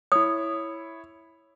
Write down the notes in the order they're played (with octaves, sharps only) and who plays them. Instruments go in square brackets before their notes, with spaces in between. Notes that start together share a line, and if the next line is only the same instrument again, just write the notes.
[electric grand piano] E4 C#5 [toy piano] D#6